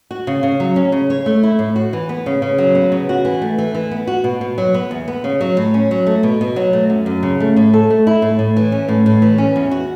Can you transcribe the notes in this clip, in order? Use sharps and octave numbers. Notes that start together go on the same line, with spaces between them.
F#4
C#3
C#3
F#3
C#4
C#3
C#5
A3
E4
A2
F#4
E3
B3
C#3
C#3
F#3
B3
C#3
F#4
E3
A3
E3
E3
B3
F#4
B2
B2
F#3
B3
E2
B3
C#3
F#3
A2
C#4
F#3
A3
B2
B2
F#3
A3
F#2
F#2
C#3
A3
A2
A4
A3
E4
A2
A2
E3
C#4
A2
A2
E3
C#4
E2
F#4